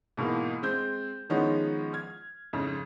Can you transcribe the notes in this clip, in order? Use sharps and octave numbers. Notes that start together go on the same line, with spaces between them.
G#2 B2 E3 A#3
G#3 C4 G6
D#3 F3 G#3 B3 C#4 D#4
F6 G#6
F2 G#2 C#3